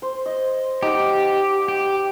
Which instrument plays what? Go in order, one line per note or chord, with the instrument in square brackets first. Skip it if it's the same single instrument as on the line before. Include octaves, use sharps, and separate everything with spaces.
[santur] C5
D#5
[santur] D#4 F#5 [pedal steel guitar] G4
[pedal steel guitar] G4